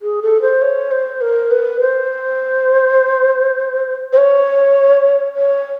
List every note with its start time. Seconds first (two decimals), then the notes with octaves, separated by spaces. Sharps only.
0.02 G#4
0.22 A4
0.42 C5
0.62 C#5
0.91 C5
1.21 A#4
1.51 B4
1.80 C5
4.13 C5
4.17 C#5
5.36 C#5